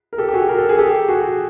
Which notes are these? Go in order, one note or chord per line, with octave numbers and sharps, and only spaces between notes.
A#4
G4 A4
G4
F#4 G#4
A#4
A4
G#4
G4 A4
F#4 G#4